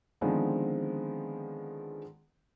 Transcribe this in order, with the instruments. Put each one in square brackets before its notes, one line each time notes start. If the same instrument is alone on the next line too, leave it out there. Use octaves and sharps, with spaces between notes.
[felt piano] D3 D#3 F3 G#3 B3 C4